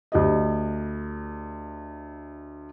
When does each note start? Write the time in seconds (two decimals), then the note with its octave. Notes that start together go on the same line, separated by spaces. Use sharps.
0.12 D2 G4 D#5